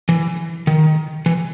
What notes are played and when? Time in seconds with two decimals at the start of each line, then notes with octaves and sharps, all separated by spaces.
0.09 E3
0.67 D#3
1.26 E3